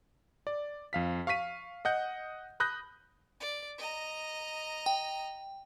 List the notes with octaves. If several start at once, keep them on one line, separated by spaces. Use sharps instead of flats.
D5
F2 F5 B6
F5 C#6 F6 B6 D#7
D#5 F#5 G6
B5 D#6 F#6 G6 A#6
D5
D#5 A#5
G5